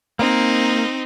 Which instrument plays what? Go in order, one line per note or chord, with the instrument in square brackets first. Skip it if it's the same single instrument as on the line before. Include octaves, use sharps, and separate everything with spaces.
[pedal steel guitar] A#3 [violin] C4 D#4